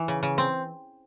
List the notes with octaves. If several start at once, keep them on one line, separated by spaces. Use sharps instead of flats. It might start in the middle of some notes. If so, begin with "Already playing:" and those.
Already playing: E3
C#3
C#3
C4